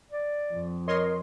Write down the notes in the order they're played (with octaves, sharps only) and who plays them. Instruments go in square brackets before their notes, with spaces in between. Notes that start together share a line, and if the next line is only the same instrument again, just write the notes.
[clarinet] D5
[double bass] F2
[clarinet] A#4 [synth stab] C#5 D#5 C6